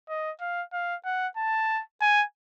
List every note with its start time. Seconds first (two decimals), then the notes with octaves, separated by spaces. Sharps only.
0.09 D#5
0.41 F5
0.73 F5
1.05 F#5
1.37 A5
2.01 G#5